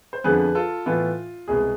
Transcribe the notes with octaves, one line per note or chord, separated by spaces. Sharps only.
C5
F2 D3 F3 B3 G#4 B4
F4 A4
A2 E3 B3 F4
C2 B2 G#3 G#4